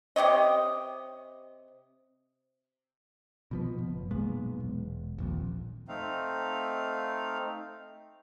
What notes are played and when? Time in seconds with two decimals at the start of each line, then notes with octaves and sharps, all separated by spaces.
0.16 C3 G4 C#5 D#5
3.51 B2 F3 B3
3.78 F#1
4.11 B1 A#2 G#3 B3
4.60 E1
5.18 D#1 A#1 F2
5.88 A3 C4 D#4 F5